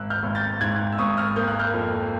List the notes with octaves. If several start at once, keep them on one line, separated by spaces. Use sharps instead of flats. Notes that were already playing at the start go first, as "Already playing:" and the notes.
Already playing: G#1 E6 F#6
F6 G6
G#1
G6 A6
G#2 F#6 G#6
E6
G#1 C#6 D#6
D#6 F6
A#3 G6
F#6
F6 G6
F2